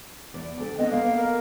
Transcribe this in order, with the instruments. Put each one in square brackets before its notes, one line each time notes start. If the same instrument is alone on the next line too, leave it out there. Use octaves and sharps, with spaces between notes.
[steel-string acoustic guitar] E2 D5
D2 A4
[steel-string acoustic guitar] B3 C4 D4 [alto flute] D#5
[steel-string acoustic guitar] A#3 B3 [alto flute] F5
[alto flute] A#4